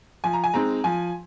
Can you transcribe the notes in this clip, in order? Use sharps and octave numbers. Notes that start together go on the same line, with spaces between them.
F3 G#5
A#5
G#5
G#3 C4 D#4 A#5
F3 G#5